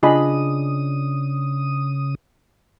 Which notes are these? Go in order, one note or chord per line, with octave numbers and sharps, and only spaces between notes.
C#3 D4 F4 G#4 D#5 G#5 B5 D#6